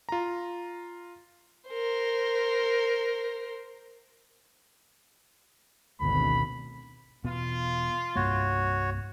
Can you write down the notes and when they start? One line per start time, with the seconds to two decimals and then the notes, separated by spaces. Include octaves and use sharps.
0.09 F4 A#5
1.69 A#4 C5
6.00 G#1 D2 B2 B5
7.24 E1 B2 B3 F4
8.16 C2 G2 A#3 F#4 C#5